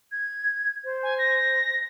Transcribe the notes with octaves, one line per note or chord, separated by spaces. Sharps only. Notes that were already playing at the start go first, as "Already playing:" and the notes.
G#6
C5
G#5
A#6